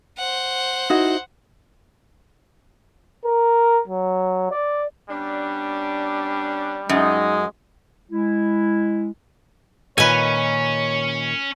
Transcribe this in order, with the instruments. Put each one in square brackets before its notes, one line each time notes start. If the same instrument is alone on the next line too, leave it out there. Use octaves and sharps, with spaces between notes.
[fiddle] C5 F#5
[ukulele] D#4 E4 F#4
[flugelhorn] A#4
F#3
D5
[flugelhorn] G3 [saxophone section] B3 C#4 D4
[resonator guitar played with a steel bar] F#2 [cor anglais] G#3 [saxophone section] D#4
[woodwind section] G#3 E4
[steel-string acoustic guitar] A#2 D#3 D#5 [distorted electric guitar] C#4 [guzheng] B4 G#5 [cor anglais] C#5